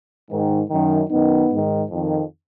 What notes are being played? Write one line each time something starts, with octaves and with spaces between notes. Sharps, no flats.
G#2 D#3
F#2 D#3
F#2 D#3 B3 D#4
G#2 D#3
F2 D#3